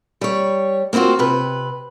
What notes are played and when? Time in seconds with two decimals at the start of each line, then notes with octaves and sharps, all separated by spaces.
0.21 G3 C#5
0.93 A#3 C4 D#4 F4 F#4
1.19 C3 B4